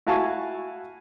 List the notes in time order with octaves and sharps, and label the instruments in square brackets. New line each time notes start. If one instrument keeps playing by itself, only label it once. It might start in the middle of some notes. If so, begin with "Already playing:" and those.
[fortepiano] E4 F#4 F5 G#5 A5 C#6